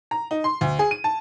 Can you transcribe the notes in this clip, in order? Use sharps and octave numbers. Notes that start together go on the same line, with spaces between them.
A#5
D#4
C6
D2
G#4
D#7
A5